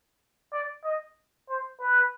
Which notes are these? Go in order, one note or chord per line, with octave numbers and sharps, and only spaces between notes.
D5
D#5
C5
B4